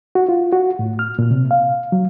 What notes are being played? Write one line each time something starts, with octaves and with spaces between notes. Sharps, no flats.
F#4
F4
F#4
A2
F6
A#2
C3
F5
F#3